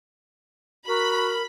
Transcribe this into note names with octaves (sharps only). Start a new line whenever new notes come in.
F#4 A#4 B5